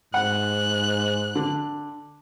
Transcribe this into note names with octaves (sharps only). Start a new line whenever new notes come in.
G#2 F#5 F#6
D3